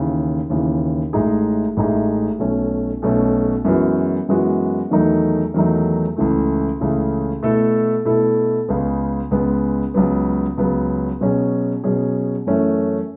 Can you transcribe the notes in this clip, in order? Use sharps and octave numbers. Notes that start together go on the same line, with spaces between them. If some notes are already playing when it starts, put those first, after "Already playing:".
Already playing: D#2 C#3 E3
D#2 C#3 E3
A1 A2 G#3 D#4 G#4
A1 A2 G#3 D#4 G#4
B1 B2 A3 C#4
B1 B2 A3 C#4
F#2 E3 G#3 B3 F#4
F#2 E3 G#3 B3 F#4
E2 D#3 F#3 A3 D#4
E2 D#3 F#3 A3 D#4
C#2 C#3 E3 A3
C#2 C#3 E3 A3
B2 A3 E4 A4
B2 A3 E4 A4
C#2 C#3 G#3 B3
C#2 C#3 G#3 B3
C#2 C#3 F#3 B3
C#2 C#3 F#3 B3
B2 F#3 C#4 G#4
B2 F#3 C#4 G#4
F#2 E3 A3 C#4